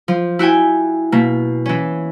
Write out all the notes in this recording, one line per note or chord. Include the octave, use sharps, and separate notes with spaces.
F3
E4 F#4 G5 G#5
B2 A#3
E3 C#4